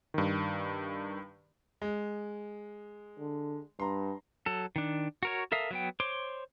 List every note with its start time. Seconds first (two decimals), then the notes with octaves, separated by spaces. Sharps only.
0.14 G2 D#3
1.82 G#3
3.19 D3
3.80 G2 A#5 C6
4.46 F#3 A4
4.76 D#3 D4
5.23 F#4 A#4 C#5
5.52 A4 A#4 E5 F5 D#6
5.71 F#3 B3 G5
6.00 C5 C#5 C6 D6